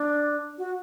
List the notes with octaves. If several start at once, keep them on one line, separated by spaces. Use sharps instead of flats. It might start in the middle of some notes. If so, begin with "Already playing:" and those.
Already playing: D4
F#4